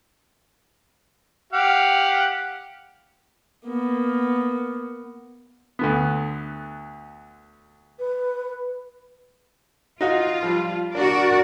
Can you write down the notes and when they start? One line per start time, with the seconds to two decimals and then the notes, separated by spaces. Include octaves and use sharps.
1.53 G4 F5 F#5
3.65 A#3 B3
5.79 D2 D3 B3
7.98 B4
10.01 D#4 F4 F#4 F5
10.43 F3 G3
10.95 D4 F#4 A#4 D5